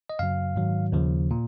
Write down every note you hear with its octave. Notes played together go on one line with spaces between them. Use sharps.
D#5
F#2 C#3 F#3 F5
G#2 D#3 F#3
D#2 C#3 F3
A#2